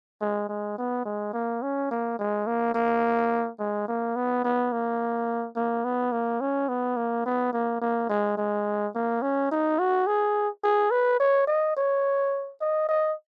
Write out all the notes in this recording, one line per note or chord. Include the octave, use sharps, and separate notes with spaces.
G#3
G#3
B3
G#3
A#3
C#4
A#3
G#3
A#3
A#3
G#3
A#3
B3
B3
A#3
A#3
B3
A#3
C#4
B3
A#3
B3
A#3
A#3
G#3
G#3
A#3
C#4
D#4
F#4
G#4
G#4
B4
C#5
D#5
C#5
D#5
D#5